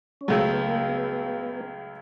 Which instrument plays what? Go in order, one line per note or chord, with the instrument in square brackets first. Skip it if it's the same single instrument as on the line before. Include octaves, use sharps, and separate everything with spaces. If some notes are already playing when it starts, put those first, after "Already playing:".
[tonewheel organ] C#4
[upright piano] C#2 C#3 F#3 A3 [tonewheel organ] C4
[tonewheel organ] B3
A#3
B3